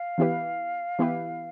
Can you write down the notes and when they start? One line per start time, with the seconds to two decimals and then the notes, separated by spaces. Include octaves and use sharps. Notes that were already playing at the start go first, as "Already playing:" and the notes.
Already playing: F5
0.18 E3 B3 E4 G4 B4
0.99 E3 B3 E4 G4 B4